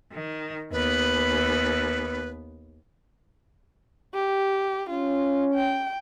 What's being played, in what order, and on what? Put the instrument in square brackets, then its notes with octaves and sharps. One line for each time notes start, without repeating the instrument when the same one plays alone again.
[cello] D#3
[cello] D#2 B3 [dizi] B4
[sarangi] G4
[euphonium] C#4 [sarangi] F4
[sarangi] G5